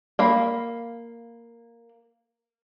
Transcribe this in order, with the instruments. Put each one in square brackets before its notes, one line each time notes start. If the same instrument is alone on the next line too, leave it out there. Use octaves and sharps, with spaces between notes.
[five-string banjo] A#3 F5 B5